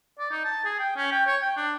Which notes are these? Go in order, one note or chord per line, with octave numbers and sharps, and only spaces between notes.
D5
D#4
A5
G#4
G5
C#4
G5
C#5
G5
D4